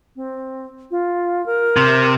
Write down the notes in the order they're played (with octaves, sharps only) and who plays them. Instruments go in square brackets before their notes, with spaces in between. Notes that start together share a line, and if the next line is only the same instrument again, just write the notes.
[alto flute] C4
F4
A#4
[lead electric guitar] C3